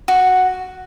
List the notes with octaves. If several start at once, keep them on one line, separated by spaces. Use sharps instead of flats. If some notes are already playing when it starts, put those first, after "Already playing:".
F#4